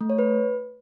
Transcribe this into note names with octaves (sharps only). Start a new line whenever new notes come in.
A3
C#5
B4